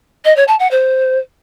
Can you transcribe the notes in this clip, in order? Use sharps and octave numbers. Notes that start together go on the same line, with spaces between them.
D#5
C#5
A5
F#5
C5